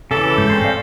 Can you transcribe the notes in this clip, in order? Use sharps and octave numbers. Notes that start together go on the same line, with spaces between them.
C#3 E3 A4 G#5 D6 E6
G#2 G#3 G6
C4 C#4 C5
D5 F5